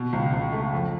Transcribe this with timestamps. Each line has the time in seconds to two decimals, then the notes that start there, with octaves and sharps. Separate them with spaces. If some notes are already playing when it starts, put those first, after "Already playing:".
Already playing: B2
0.13 C#2
0.33 C#2
0.52 A3
0.73 F2